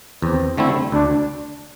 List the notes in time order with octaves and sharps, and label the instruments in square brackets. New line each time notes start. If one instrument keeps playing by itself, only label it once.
[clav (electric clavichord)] E2 [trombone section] C4
[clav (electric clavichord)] D3 A3 C4 E4
[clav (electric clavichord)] D2 [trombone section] D4